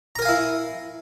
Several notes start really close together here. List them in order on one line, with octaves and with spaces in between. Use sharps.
A#5 A#4 G#5 F5 E4